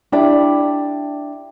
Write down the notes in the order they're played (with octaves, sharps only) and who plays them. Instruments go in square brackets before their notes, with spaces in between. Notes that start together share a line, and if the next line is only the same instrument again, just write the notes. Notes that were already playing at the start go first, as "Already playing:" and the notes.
[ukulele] D4 E4 G4 D5